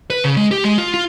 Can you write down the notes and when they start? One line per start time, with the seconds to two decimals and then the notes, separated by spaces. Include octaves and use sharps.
0.10 B4
0.24 C#3
0.37 G#3
0.51 G4
0.64 G#3
0.78 F4
0.94 F4